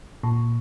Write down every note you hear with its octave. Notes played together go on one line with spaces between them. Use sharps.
A#2